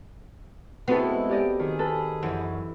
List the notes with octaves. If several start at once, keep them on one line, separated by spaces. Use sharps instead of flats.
G#3 B3 C4 E4 F#4 A4
G4 D5 D#5
D#3 G#4
A4 B4
F#2 E3